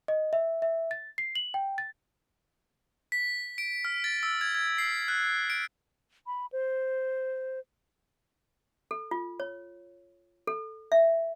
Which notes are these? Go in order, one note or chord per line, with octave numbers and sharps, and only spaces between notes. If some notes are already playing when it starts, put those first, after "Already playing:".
D#5
E5
E5
A6
C7
F#7
G5
A6
B6
D7
F6
A6
E6
G#6
G#6
C7
F#6
D7
B5
C5
A4
F4
C#5
A4
E5